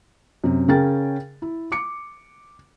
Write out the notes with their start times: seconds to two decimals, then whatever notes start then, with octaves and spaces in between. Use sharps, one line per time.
0.44 F#2 C3
0.68 C#3 C#4 G#4 A#4 G5 A6
1.42 E4
1.72 D6 C#7